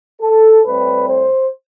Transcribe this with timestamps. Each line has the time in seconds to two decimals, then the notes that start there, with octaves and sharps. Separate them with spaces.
0.21 A4
0.65 A2 G3 C4 B4
1.09 C5